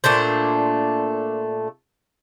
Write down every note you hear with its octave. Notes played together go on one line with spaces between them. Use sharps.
A#2 A3 D4 C5